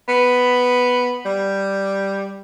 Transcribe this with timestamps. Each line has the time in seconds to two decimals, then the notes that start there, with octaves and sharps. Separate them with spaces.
0.08 B3
1.25 G3